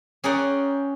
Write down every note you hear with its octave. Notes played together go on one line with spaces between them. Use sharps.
C#4 G#4 A#4 D5 F#5 G5